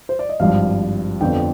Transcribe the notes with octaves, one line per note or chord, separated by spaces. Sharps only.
C5
D5
D#5
G#1 G2 F3 F5
F2 D3 F3 B3 G5